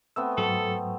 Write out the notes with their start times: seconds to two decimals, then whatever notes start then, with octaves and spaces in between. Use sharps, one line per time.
0.16 A3 B3 C4 E6
0.38 G#2 F#3 A4